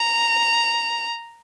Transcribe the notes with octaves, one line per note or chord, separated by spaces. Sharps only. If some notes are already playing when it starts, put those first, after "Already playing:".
Already playing: A#5